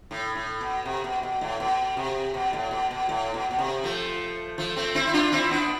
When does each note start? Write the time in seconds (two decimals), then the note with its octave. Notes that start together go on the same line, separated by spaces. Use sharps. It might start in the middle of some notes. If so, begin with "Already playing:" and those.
0.11 A2
0.35 A2
0.61 B2
0.85 C3
1.04 B2
1.23 B2
1.41 A2
1.60 B2
1.97 C3
2.34 B2
2.53 A2
2.71 B2
2.91 B2
3.09 A2
3.34 B2
3.51 B2
3.59 C3
3.84 F3 A3
4.58 F3 A3
4.76 A3 C4
4.95 C4 E4
5.07 E4
5.13 D4 F4
5.32 C4 E4
5.51 B3 D4